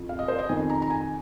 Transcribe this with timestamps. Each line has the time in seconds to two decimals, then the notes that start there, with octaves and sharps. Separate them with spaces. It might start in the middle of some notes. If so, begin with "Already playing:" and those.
Already playing: F2 F3
0.09 F5
0.19 D#5
0.28 C5
0.39 D#5
0.49 F2 D#3 G#5
0.70 A#5
0.82 A#5
0.90 G#5